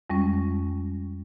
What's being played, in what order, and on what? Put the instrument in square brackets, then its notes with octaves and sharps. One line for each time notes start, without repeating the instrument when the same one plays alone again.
[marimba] F2 G3 G#3 C#4